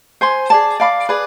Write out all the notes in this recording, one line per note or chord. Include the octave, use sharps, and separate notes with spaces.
C5 G#5 C6
G#4 D5 A5
D5 F5 B5 D6
G#4 B4 D5